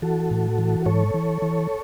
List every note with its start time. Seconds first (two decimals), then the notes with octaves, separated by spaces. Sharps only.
0.02 E3 F#4 A4
0.31 A2
0.58 E3
0.86 G#2 A4 C#5
1.14 E3
1.42 E3